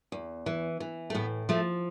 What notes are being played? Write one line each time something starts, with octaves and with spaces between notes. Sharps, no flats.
E2
E3
E3
A3
A2 B3
F3 A3